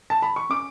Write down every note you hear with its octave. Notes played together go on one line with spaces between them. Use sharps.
A5
B5
C#6
C#4 D6